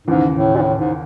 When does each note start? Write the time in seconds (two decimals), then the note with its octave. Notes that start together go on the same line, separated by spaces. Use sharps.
0.07 D#2 G#2 C#3 E3
0.35 A2
0.56 A#2
0.61 A2
0.79 G#2